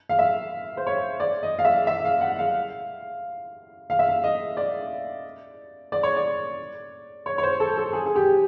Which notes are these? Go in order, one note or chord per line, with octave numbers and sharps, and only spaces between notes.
F5
E5
C5
C#5
D5
D#5
F5
E5
E5
F5
F#5
F5
F5
E5
F5
D#5
D5
D5
C#5
D5
C#5
C#5
C5
A4
A4
G#4
G#4
G4